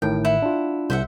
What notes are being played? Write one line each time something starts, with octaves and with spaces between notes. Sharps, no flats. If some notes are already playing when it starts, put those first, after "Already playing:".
A1 A2 D#3 G5
E4 F#5
D4 F4
C2 C5 E5 F#5